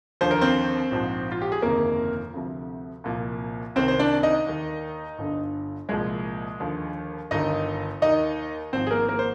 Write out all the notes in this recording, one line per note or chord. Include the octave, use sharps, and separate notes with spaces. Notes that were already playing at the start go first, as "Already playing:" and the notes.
D#2 D3 F3 C5
A#4
C4 C5
A#1 G#2 F3
F4
G4
G#4
G1 F2 C3 D#3 A#3 A#4
D2 C3 F3
C2 A#2 F3
C2 C3 D#3 C4 C5
C5
D4 D5
D#4 D#5
D#2 D#3
G1 G2 D3
C2 A#2 F3 G#3 G#4
D#2 D3 F3
G1 G2 D#3 D#4 D#5
D#2 D#3 D#4 D#5
G#1 G#2 F3 C4 C5
G#4
A#3 A#4
A#3 A#4
C5